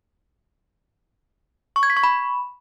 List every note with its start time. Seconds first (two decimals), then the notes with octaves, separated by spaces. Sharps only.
1.76 C#6
1.83 G#6
1.90 B6
1.97 C#6
2.03 B5